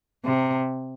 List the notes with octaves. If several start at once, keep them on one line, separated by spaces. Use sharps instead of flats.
C3